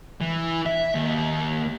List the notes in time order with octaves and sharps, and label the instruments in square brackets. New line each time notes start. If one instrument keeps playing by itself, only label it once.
[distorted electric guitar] E3
E5
D#2